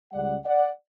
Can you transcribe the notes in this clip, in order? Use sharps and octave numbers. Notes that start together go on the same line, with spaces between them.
C#2 C#3 G3 D5 F#5
D5 F#5